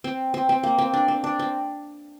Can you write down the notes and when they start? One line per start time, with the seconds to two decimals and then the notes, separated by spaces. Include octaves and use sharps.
0.04 C4
0.34 C4
0.49 C4
0.63 A#3
0.78 C4
0.94 D4
1.08 C4
1.24 D4
1.39 C4